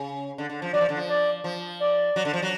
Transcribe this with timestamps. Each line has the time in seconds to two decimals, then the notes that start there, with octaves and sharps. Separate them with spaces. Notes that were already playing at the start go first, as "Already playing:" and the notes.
Already playing: C#3
0.38 D3
0.50 D3
0.62 F3
0.73 F#3 D5
0.81 F3
0.89 D3
0.97 F3
1.09 D5
1.44 F3
1.80 D5
2.16 F#3
2.25 D3
2.33 F3
2.42 F#3